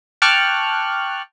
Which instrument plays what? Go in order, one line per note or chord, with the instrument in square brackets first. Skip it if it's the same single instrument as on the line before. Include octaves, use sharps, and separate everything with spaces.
[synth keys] G5 A5 C#6 D6 F6 F#6